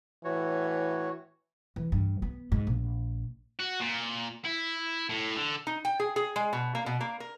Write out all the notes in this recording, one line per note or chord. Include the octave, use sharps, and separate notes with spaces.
A2 E3 F#4 C#5
E3
G2
B3
G#2
A#1
F#4
A#2
E4
A2
D3
D#4
G5
G#4
G#4
G#3
B2
A#3
B2
A#3
A#4